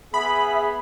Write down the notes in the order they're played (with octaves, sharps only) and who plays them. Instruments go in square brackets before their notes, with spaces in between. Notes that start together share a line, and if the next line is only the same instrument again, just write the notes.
[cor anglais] B3 [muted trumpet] G#4 [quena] E5 [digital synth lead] B5